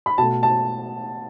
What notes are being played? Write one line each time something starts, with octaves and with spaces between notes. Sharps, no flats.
B5
B2 A3 A5
A5